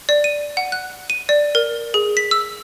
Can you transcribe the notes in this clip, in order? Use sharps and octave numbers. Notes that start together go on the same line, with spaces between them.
D5
D#7
F#5
F#6
D#7
D5
A#4
G#4
B6
E6